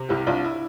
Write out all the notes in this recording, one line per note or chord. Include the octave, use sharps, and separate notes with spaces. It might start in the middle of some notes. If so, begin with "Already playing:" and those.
Already playing: C3
C2 E4 G4
C2 D4 F4
E4